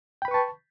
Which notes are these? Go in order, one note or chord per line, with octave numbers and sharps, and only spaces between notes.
B4 G5 A5 B5 C#6